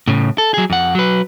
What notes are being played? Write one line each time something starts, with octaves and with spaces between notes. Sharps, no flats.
A2 C#3
A4
F#3 G#4
F2 F#5
F#3 B4